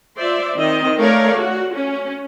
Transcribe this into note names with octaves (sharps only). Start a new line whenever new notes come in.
F4 C5 D5 E5
D#3 C4 D#5
A3 A#4 C#5 D5 F5
F#4
C#4